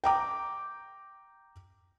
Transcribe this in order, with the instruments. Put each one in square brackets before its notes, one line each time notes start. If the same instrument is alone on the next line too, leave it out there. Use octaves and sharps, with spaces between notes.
[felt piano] G5 A#5 D6